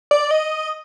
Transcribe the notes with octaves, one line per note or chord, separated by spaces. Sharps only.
D5
D#5